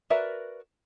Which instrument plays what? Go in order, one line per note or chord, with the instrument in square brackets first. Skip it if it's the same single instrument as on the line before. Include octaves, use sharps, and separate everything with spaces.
[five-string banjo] F#4 A#4 B4 D5 E5